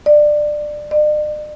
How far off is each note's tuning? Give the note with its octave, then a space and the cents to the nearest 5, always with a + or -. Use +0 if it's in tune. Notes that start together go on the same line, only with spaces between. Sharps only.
D5 +20
D5 +45